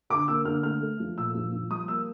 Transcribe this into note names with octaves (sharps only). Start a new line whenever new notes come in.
D3 D6
A#3 E6
D3 F6
A3 F6
A3
F3
A#2 E6
F3
F3
G3 D#6
A#3 E6